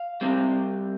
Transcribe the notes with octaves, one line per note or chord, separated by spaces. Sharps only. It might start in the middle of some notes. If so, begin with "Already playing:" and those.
Already playing: F5
C3 G3 C4